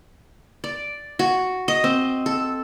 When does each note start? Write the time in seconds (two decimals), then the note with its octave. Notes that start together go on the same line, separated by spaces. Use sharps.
0.64 D5
1.19 F#4
1.68 D#5
1.84 C4
2.26 A4